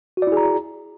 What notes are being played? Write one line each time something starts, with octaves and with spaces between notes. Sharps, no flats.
E4 F#4 G#4 D5 A#5